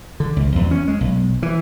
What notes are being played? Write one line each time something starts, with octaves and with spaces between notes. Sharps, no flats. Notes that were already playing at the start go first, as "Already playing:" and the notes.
D3
C#2
E2
C#4
G#3
B1
E3